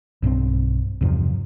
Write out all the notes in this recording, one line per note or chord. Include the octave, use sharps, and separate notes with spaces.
B1 G2 D#3 C4
E2 G2 C3 F3